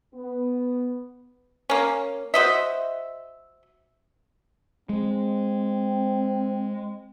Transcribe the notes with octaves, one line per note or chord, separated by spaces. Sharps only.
B3
A#3 C#4
F#4 C5 D#5 E5
G#3 C4